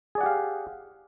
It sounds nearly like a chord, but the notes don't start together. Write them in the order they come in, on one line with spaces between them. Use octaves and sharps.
G#4 D5 F#5 G4 F5